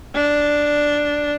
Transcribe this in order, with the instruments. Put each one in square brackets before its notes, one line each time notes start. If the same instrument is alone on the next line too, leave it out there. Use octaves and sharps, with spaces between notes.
[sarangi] D4